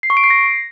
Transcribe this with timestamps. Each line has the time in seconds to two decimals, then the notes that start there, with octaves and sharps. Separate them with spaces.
0.03 C7
0.10 C#6
0.17 D7
0.24 C7
0.30 A#6